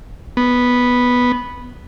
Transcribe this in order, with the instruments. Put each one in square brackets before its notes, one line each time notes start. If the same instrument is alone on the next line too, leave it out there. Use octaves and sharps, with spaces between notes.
[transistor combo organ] B3